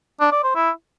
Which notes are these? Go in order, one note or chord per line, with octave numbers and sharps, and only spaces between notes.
D4
D5
C5
E4